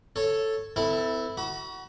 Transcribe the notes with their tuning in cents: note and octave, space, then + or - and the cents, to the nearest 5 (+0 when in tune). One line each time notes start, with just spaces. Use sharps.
A4 +0 C#5 -5
C4 -45 E4 -10 A4 +20
F#4 +20 B5 -40